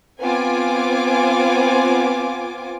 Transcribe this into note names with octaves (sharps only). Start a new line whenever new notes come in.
B3 C4 F4 G#5 D6